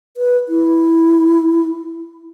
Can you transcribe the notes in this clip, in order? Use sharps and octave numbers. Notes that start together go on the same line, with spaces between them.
B4
E4